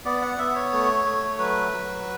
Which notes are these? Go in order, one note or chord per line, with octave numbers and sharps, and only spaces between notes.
B3 D5
F#5
B3 E5
C#5
A3
A3
F#3 B4
F#3